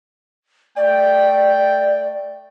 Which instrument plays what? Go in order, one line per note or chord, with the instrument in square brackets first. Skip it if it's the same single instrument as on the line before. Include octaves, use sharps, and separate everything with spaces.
[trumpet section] A3 G5 [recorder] D5